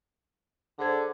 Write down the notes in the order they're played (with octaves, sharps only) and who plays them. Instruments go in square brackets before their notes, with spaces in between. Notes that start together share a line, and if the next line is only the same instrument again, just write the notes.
[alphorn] D3 [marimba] G#4 C5 G#6